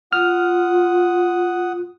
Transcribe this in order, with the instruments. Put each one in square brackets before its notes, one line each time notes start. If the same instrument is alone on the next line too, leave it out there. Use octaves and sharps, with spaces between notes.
[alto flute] F4 [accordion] F#5 D#6 [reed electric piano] F6